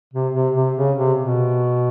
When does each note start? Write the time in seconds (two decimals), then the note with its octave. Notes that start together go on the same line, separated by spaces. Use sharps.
0.13 C3
0.34 C3
0.55 C3
0.77 C#3
0.98 C3
1.19 B2